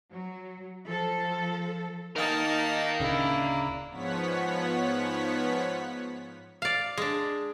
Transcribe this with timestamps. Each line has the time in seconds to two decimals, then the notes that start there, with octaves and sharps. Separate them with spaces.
0.12 F#3
0.85 F3 A4
2.16 D#3 D#4 A#4 F5 A5
3.00 D1 C#3 D4 E4
3.91 G#2 F3 B3 C#5 F#5 B6
6.62 D5 F5
6.97 G#3 D4